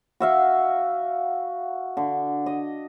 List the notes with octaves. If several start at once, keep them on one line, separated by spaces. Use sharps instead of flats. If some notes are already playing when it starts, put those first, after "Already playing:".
F#4 E5 F5
D3
D#5